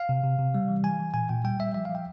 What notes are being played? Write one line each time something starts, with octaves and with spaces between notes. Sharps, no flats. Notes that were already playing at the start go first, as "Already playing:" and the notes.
Already playing: F5
C3
C3
C3
G3
E3
E3 G#5
E3
A#2 G#5
A#2 G5
G3 G5
G3 E5
F3 E5
F5
F3
G5